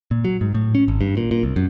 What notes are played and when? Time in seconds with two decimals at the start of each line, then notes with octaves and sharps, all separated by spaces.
0.11 A#2
0.25 F#3
0.41 G#2
0.54 A2
0.75 C#4
0.88 G#1
1.01 G2
1.17 A#2
1.31 A#2
1.43 C2
1.56 F#2